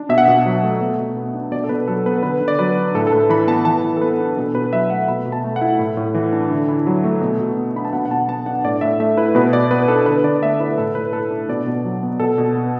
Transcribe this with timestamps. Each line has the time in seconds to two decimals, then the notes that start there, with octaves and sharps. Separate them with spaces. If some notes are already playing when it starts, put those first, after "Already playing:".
Already playing: D4
0.09 B2 E5
0.18 F#5
0.25 B2 E5
0.45 F#3
0.63 A3
0.81 B2
0.99 B2
1.17 B3
1.34 D4
1.51 B2 D5
1.64 A4
1.69 B2 B4
1.88 F#3 A4
2.06 B3 B4
2.23 D3 B4
2.41 D3
2.48 D5
2.59 F#3 B4
2.77 D4
2.94 A2 A4
3.07 A4
3.12 A2 B4
3.29 E3 B5
3.47 B3 A5
3.65 E3 A5
3.83 E3
3.97 A4
4.01 B3 B4
4.19 D4
4.36 B2 A4
4.54 B2 B4
4.73 F#3 E5
4.90 A3 F#5
5.08 B2 B5
5.25 B2
5.32 A5
5.44 A3
5.56 F#5
5.61 E4
5.79 A2
5.97 A2
6.14 E3
6.32 D4
6.51 D3
6.69 E4
6.87 F#3
7.04 A3
7.21 B2
7.40 B2
7.57 B3
7.75 D4 B5
7.85 A5
7.93 B2 F#5
8.05 F#5
8.11 B2 A5
8.28 B3 A5
8.46 D4 F#5
8.64 A2 D5
8.81 A2 E5
9.00 A3 E5
9.17 E4 B4
9.35 B2 B4
9.53 B2 D5
9.71 B3 B4
9.88 D4 A4
10.06 D3 B4
10.24 D3 D5
10.42 A3 E5
10.59 E4 B4
10.78 A2 A4
10.95 A2 B4
11.13 A3 A4
11.30 D4
11.48 B2 D5
11.66 B2
11.84 F#3
12.03 B3
12.20 B2 A4
12.38 B2
12.56 B3